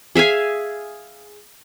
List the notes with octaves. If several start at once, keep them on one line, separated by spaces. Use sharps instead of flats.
G#4 E5 F5 G#5